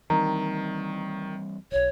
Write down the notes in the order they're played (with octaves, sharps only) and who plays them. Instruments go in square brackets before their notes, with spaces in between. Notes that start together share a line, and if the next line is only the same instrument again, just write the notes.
[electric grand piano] D#3 [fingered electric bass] E3 G3 C4 [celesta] A#5
[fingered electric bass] D#1 B1 [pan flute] C#5